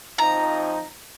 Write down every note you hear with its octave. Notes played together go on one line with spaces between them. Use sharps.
F2 F3 D#4 A#5